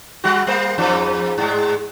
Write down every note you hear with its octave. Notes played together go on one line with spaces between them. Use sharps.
G3 F#4
G3 A#3 C5
F2 G#2 F3
G#2 G#3